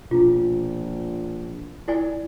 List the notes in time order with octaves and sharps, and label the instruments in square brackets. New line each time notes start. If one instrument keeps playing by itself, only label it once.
[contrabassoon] A#1 [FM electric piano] B2 [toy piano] F4
[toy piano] E4 D5 G#5